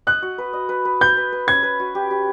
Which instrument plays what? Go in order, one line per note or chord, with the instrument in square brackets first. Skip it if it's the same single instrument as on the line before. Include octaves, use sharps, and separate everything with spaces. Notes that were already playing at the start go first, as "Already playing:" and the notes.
[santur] D#5 [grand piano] F#6
[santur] F#4
B4
D#5
B4
B4
[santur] B4 [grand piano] G6
[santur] B4
B4
[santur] C#4 [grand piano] G#6
[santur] B4
F#4
G4
G4